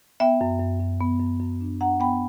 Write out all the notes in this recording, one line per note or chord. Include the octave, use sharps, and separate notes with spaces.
B3 E5 G5
F#2
F#2
F#2
B3
F#2
F#2
D4
D4 F#5 A#5
B3 G5 B5